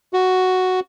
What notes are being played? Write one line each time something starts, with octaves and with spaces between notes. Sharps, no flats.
F#4